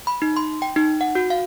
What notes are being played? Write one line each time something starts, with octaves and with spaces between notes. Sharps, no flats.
B5
D#4
C6
G5
D#4
F#5
F#4
F5